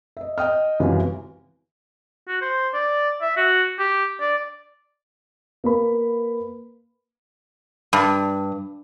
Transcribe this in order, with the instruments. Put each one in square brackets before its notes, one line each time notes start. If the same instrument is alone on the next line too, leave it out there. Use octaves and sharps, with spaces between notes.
[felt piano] D#5 E5
D#5 G5 D#6 F6
C#2 F#2 C3 E3 G3 B3
[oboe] F#4
C5
D5
E5
F#4
G4
D5
[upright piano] A#3 B4 B5
[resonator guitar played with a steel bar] G2